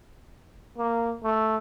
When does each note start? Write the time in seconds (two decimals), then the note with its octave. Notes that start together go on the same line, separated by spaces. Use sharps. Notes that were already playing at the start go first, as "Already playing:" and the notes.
0.78 A#3
1.24 A3